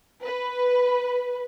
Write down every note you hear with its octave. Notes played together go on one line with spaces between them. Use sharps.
B4